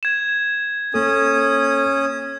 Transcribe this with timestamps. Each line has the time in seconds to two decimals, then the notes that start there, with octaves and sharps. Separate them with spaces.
0.03 G#6 E7
0.94 A#3 C#4 A4 D#6